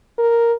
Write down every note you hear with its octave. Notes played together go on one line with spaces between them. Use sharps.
A#4